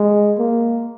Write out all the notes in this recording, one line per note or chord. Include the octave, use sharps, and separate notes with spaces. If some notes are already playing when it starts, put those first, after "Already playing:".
Already playing: G#3
A#3